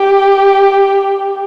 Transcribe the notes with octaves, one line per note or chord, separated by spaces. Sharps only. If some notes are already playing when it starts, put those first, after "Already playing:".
Already playing: G4